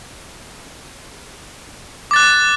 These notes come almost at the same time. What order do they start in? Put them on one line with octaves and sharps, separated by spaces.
D6 A6 F#6